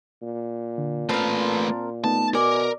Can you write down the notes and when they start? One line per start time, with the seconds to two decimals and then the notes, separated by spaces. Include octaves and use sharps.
0.22 A#2
0.78 D3
1.09 A3 C4 A#4 B4 A5
2.04 A3 B3 D#4 A5
2.35 B2 A#4 D5 G#5